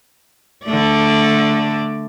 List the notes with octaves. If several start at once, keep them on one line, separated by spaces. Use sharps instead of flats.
D3 A3 D5